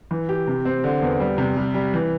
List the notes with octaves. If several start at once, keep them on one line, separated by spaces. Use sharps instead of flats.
E3
G4
C3
C4
D3
E2
G3
C3
G3
G3
E3